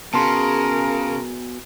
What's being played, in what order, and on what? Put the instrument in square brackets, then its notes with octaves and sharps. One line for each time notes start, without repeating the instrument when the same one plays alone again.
[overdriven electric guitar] C#3 [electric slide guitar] B3 F#4 G#4 [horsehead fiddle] A#4 [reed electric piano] A5 C6